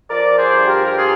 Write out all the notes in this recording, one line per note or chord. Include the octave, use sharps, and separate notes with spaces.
F3 A#4 D5
G#4 C5
G2
G4 A#4
A#4
F4 G#4